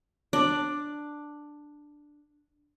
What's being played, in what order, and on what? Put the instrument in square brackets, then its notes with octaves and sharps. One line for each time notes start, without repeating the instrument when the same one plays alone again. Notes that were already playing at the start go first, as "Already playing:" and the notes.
[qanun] D4 D5